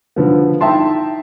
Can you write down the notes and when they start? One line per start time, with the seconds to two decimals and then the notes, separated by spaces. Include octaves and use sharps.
0.16 D3 F3 B3
0.61 D#4 E4 E5 G5 A5 C6